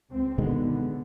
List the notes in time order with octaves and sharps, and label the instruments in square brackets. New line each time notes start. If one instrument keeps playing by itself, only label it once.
[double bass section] C#2 C4
[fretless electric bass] B2 D#3 G#3 [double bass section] D3 B3